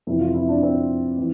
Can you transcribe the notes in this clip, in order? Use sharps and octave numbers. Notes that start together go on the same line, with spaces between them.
F2 C3 E3 E4
F4
E4
D4
C4
E3